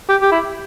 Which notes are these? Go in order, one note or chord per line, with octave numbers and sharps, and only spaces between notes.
G4
G4
E4